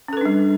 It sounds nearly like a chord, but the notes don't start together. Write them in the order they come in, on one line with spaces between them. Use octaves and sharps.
C#4 A4 B4 D4 G3